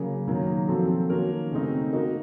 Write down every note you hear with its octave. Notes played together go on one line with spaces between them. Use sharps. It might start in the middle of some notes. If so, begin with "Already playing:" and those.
Already playing: C#3 F#3 A#3
D#3 F#3 A#3
F3 C4 F#4 A4
D#3 A#3 C#4 F#4 A#4
C#3 A3 C4 D#4
A#3 D#4 F#4 A#4 D#5